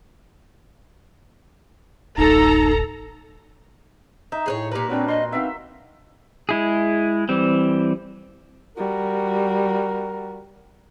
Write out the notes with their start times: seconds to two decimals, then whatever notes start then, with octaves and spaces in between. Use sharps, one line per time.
2.18 D1 A1 D#4 A4 A#5
4.32 D#4 E5
4.46 A2 G#4 B4 C#5
4.72 A#2 G4 A#4 B4
4.90 C4 D4 F#4 C#5
5.08 D#5 C6
5.32 B3 C4 D#4 E5 F5
6.49 G#3 E4 G#4
7.29 E3 G3 C4
8.77 G3 F#4 A#4